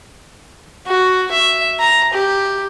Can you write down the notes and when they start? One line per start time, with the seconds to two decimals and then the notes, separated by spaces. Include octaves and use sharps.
0.87 F#4
1.31 E5
1.80 A#5
2.13 G4